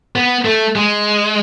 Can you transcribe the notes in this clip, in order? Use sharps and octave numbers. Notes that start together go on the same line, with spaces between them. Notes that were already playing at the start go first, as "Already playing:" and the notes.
B3
A3
G#3